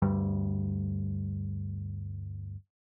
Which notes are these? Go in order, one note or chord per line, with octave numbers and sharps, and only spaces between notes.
D2 G2 G3